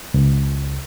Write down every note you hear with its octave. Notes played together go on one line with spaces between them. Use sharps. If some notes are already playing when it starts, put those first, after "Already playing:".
C#2